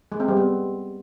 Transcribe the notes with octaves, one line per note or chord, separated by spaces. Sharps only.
G#3
C4
G3
B3